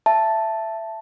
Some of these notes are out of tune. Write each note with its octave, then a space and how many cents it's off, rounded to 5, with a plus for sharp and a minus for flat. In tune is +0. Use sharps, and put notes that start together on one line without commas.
E5 +15 A5 +0